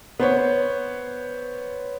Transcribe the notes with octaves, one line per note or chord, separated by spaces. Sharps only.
B3 C5 C#5